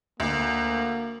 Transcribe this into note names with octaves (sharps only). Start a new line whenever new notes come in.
D2 A#3